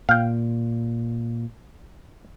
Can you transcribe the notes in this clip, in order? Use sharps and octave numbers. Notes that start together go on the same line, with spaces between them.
A#2 F5 G5